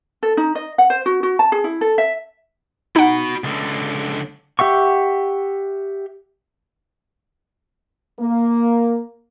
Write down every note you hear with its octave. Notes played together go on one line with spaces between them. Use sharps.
A4
D#4
D#5
F#5
C5
F#4
F#4
A5
G#4
E4
A4
E5
D#4 F#4 F#5 B5
C#2 D3
G4 E5 F#5 C#6
A#3